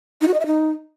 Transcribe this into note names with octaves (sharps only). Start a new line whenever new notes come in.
D#4
F#4
D#5
E5
D#4